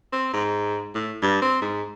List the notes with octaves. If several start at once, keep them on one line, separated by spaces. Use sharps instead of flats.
C4
G#2
A2
G2
C4
G#2